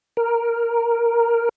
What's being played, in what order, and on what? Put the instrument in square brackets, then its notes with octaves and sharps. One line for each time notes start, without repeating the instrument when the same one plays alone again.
[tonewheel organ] A#4